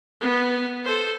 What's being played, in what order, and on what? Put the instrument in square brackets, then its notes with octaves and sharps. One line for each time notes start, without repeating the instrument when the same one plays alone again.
[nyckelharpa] B3
A4 C5